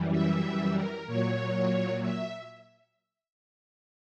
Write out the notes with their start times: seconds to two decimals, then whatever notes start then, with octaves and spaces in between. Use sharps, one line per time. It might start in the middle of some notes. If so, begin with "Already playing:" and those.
Already playing: F#2 E3 G3
0.11 E5
0.75 A#4
1.06 A#2 F#3 C#5
2.01 E5